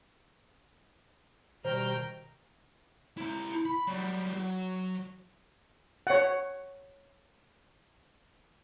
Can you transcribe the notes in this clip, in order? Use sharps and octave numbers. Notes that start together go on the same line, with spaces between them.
B2 D#3 G3 C5 G5 A#5 F6 G6
E4 A#5
B5
F#3 G3
F#3
C#5 F#5